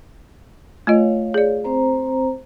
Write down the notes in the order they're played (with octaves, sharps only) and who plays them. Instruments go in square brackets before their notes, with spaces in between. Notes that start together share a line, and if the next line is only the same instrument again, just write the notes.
[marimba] A3 F4 D#5 [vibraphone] C#5 F5
[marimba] G#4 D5
[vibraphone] C4 C5 A#5